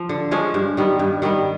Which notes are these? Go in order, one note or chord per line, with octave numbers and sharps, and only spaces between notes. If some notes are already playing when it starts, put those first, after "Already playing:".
Already playing: F3
D3
F3 G#3 C#4
G2
D#3 G3 B3
G2
D#3 G3 B3